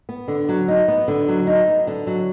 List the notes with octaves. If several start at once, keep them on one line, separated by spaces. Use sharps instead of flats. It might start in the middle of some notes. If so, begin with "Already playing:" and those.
B3
D3
F#3
D#4
B3
D3
F#3
D#4
B3
D3
F#3